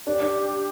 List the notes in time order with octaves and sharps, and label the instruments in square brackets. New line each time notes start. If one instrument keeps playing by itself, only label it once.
[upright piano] D4 [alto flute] G4
[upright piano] D4